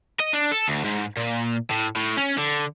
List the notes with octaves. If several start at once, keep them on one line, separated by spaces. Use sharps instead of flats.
D#5
D4
A4
D2
G#2
A#2
A2
A2
C#4
D3